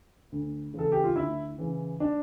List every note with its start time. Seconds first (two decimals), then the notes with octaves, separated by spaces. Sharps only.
0.32 D2
0.74 C#3 E3 A4
0.92 G4
1.04 F4
1.16 D2 E4
1.58 C#3 E3
2.00 D4